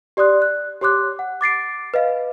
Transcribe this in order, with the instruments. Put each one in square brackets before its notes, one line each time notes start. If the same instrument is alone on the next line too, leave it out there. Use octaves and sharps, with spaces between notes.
[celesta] G4 D5 C6 D#6 F#6
F#6
G4 C#5 C6 D6 F#6
F#5
D6 A6 C7 D7
B4 D#5 F5